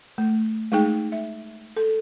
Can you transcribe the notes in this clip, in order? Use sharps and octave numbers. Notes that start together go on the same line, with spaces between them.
A3
G#3 A3 D#4 G#4 G5
E5
A4